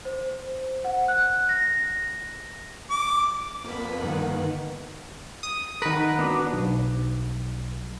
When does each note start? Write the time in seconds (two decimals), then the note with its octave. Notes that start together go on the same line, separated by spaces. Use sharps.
0.05 C5
0.84 F#5
1.08 F#6
1.49 A#6
2.90 D6
3.64 F2 A#3 B3 B4 B5
4.04 G2 D3 D#3 B4 F#5
5.43 D#6
5.82 D#3 A#4 B4 F#5
6.19 B3 D4 F#4
6.53 B1